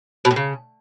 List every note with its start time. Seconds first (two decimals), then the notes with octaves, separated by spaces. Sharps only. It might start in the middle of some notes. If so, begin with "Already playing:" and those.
0.25 B2
0.31 A2
0.36 C#3